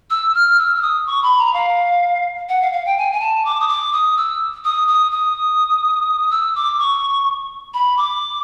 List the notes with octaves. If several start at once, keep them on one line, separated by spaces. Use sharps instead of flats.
E6
F6
E6
E6
D#6
C#6
B5
A#5
F5
F#5
F5
F5
G5
G#5
G#5
A5
D6
D#6
D6
D#6
E6
D#6
D#6
D#6
E6
D6
C#6
B5
D6